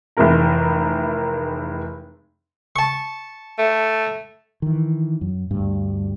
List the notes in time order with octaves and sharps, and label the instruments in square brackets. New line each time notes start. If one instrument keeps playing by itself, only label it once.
[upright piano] F1 E3 G#3 A#4 A#5
[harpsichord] A5 C#6
[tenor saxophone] A3
[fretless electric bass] D#3 E3
F#2
D2 G2